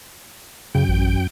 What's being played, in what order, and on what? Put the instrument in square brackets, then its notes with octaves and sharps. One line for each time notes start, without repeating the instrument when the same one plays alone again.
[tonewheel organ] F#2 G5 [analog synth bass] C#3
[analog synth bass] A1